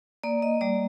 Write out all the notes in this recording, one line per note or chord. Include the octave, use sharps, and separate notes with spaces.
A#3 D5
D#5
G3 D5